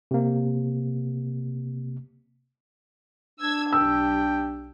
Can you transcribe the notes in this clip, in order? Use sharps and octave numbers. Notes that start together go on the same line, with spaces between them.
C3 A#3
D4 E6 G#6
B1 G4 G5 E6